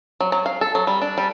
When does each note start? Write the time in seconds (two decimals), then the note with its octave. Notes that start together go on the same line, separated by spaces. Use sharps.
0.20 F#3
0.32 F#3
0.46 F5
0.61 A4
0.75 F#3
0.87 G3
1.02 D4
1.18 G3